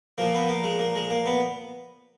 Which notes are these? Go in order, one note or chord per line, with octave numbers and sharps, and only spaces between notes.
A#2 F3 A#3
B3
A#3
G#3
A#3
G#3
A#3
B3